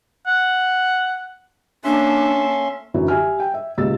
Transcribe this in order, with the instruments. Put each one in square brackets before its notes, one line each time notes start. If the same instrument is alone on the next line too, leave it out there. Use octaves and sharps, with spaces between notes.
[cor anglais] F#5
[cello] A#3 A4 [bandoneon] C#4 E5 C6 [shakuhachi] D4
[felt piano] F#2 D3 E3 F#3
G4 E5 G#5 F6
G5
E5
C#2 A#2 G4 E6 A6